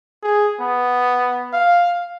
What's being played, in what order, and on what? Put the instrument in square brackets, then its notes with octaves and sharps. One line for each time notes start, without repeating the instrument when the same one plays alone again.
[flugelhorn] G#4
B3
F5